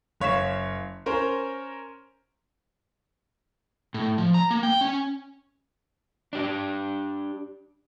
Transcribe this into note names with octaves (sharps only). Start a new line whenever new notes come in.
F#1 C#5 F5 B6 E7
C#4 A#4 C5
A2
F3
A#5
A#3
G5
C#4
D4 G4